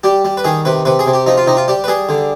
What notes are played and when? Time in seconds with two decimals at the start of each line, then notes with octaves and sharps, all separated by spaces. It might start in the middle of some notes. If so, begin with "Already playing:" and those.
0.04 G3 G4
0.25 G3
0.37 B4
0.44 D#3 G#4
0.65 C3 B4
0.85 C3 B4
0.99 G#4
1.06 C3
1.13 G4
1.26 F3 D#4
1.37 F4
1.47 C3 D#4
1.57 F4
1.68 G3 G4
1.84 B4
1.88 G3 G#4
2.09 D3